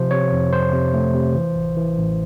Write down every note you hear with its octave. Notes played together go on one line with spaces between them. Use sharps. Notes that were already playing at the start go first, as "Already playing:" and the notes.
Already playing: C3 F3 C5
C3 C#5
F2
F2 C5
C3
A3
C3
E3
A1
E3
A1